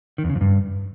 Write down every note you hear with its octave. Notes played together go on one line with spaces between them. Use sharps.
D#3
E2
C#3
F2
G2